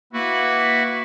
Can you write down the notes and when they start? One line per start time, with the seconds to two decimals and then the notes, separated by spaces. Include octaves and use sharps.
0.13 A#3 E4 F#4 B4